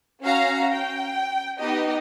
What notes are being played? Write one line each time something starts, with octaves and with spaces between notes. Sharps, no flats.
C#4 F#4 F5 A#5
G5
B3 D#4 G4 D#5